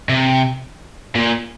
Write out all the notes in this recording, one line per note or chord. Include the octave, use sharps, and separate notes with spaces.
C3
A#2